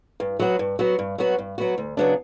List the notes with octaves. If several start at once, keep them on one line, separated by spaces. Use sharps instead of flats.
G2
F#3 B3 F#4
G2
F#3 B3 F#4
G2
F#3 B3 F#4
G2
F#3 B3 F#4
D2
C#3 F#3 B3 D4